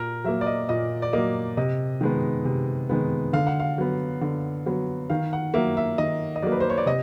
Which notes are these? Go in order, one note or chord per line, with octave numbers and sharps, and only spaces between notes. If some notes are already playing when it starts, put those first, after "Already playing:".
Already playing: A#2 A#4
F#3 A#3 E5
D5
D#5
A#2 D#5
D5
F#3 A#3 D#5
C3 D#5
D#3 G#3 B3
C3
D#3 G#3 B3
D3 F5
F#5
F5
F#3 B3
D3
F#3 B3
D#3 F5
F#5
F#3 A#3 E5
E5
D#3 D#5
D#5
F#3 A#3 D5
B4
C5
C#5
D5
C3 D#5